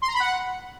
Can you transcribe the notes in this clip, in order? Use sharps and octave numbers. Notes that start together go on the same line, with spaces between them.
C6
A#5
B5
F#5